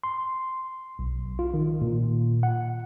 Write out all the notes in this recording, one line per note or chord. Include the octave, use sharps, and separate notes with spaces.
C6
B1
F4
D#3
A#2
F#5